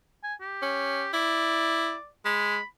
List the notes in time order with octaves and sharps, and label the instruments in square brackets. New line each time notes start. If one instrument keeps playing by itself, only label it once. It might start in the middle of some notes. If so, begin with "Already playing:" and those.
[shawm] G#5
G4
[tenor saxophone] C#4
[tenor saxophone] E4 [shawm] D5
[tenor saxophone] G#3 [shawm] B5